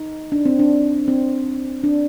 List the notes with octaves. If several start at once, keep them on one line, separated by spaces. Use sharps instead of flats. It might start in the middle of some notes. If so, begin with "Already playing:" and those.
Already playing: D#4
D4
C4
D4
C4
D4